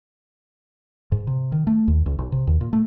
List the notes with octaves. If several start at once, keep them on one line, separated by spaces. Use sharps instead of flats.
G#2
C3
D#3
A3
D#2
C#2
B1
C3
D#2
A#2
A3